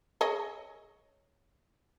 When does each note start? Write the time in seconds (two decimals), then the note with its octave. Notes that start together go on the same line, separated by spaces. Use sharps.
0.21 G#4 C#5 D#5